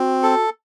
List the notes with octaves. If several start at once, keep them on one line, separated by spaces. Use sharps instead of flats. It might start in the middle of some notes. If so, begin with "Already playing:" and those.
Already playing: C4 F#4
A4